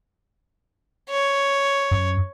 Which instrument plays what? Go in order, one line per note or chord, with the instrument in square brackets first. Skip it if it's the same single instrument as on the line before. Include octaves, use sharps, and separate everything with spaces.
[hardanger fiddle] C#5
[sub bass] F#2